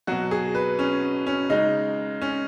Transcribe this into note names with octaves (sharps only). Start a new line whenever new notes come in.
B2 F#3 F#4
G#4
B4
C#4
C#4
C#3 G#3 D#4
C#4